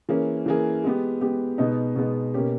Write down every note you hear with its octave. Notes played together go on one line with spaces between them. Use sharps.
E3 A#3 C#4 G#4
E3 A#3 C#4 G#4
G#3 B3 G4
G#3 B3 G4
B2 G#3 B3 D#4
B2 G#3 B3 D#4
B2 A#3 C#4 G4